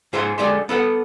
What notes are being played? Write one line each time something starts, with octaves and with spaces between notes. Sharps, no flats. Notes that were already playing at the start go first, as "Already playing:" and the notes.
G#2 G#4 C5 E5 C6
D3 G#3 G4 D5 E5 C6
B3 A4 B4 F#5